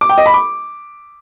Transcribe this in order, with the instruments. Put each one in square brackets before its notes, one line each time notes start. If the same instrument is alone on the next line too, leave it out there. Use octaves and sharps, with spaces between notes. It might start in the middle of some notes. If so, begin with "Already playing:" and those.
[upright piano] D6
G5
D#5
B5
D6